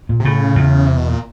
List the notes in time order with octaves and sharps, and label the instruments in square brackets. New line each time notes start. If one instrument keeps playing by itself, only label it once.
[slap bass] A#2
[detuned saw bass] C3
[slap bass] A2 [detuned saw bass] C#3
[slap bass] E2
[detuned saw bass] C3
B2
A#2